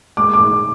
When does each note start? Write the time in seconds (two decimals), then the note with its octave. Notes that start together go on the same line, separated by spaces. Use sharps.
0.17 G#3 D6
0.33 D6
0.39 G#2